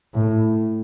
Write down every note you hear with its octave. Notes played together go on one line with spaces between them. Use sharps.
A2